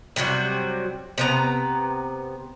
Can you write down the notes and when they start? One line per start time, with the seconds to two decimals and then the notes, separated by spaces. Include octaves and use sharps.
0.16 C3 F#3 G3 F#4
1.18 C3 B3 A#5